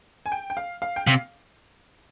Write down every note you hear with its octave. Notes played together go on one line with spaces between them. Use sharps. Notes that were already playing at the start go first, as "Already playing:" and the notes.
G#5
G5
G5
F5
F5
G5
C3 F5